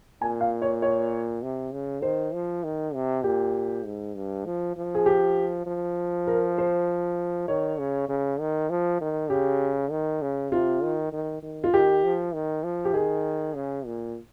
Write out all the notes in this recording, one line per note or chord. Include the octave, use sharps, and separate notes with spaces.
A#2 G#5
F5
C#5
C#5
C3
C#3
D#3 C5
F3
D#3
C3
A#2 G4
G#2
G2
F3
F3
G#4
G4
F3
A#4
C5
D#3 C#5
C#3
C#3
D#3
F3
D#3
C#3 G4
D#3
C#3
C3 F4
D#3
D#3
D#3
F4
D#3 G4
F3
D#3
F3
G4
D#3 G#4
C#3
A#2